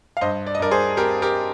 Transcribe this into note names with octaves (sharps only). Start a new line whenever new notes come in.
F5
G2 C5 D#5
D5
D#5
G2 A#4 D5
G#4 C5
C4 G4 A#4
G4 A#4